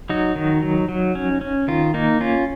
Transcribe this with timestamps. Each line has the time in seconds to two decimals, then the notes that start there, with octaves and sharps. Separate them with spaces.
0.09 F#3 D#4 F#4
0.36 D#3
0.63 F#3
0.89 F#3
1.15 C#4
1.41 C#4
1.68 D#3 F4
1.94 A#3 D#4
2.20 C#4 F4